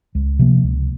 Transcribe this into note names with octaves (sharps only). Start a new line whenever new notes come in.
C#2
C3 F3 A#3
C#2